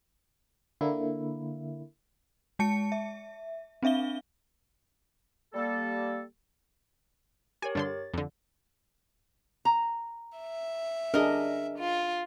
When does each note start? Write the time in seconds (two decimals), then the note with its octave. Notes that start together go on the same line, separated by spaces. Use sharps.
0.81 D3 A#3 E4
2.59 G#3 A5 C#7
2.92 E5
3.83 C4 D4 E5 F5 G7
5.54 G3 A#3 A4
7.62 G4 A#4 C#5 G#5
7.75 G2 D3 C6 A6
8.14 F2 D3
9.65 A#5
10.38 E5
11.14 D4 G#4 A#4 D#5
11.78 F4